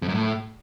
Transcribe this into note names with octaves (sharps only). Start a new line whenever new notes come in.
F2
F#2
A2